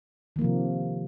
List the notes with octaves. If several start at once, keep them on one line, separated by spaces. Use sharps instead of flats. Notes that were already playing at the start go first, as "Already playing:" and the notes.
C3 D#3 F3 A#3